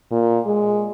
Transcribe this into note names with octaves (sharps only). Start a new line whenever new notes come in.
A#2
G#3